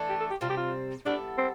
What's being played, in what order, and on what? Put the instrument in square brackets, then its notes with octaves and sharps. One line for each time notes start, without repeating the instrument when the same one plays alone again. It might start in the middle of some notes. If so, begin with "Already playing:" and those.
Already playing: [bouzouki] E3 A3 D4
[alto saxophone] G4
A4
G4
[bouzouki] C3 G3 C4 [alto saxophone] F4
[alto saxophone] G4
F4
[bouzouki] G3 B3 E4 A4 [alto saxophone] D4
[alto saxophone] C4